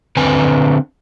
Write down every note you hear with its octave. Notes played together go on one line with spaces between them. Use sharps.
D3 C4 B4 G#5